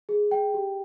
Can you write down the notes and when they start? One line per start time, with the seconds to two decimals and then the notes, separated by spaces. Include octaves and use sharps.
0.09 G#4
0.31 G5
0.54 G4